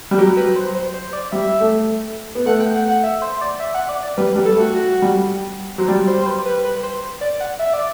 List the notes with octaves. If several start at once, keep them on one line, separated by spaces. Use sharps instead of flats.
G3
F#3 G4
B4
C5
C5
C5
D5
G3 E5
A3
B3
A3 F#5
G5
F#5
F#5
E5
C5
D5
E5
F#5
D5
D5
G3 B4
G3
A4
A3
F#4
F#4
G3
F#3 C5
G3 D5
C5
C5
B4
B4
B4
C5
D5
F#5
E5
D5